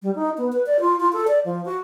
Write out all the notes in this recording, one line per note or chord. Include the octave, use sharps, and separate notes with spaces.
G3
D#4
B3
B4
D5
F4
F4
A4
D5
F3
F#4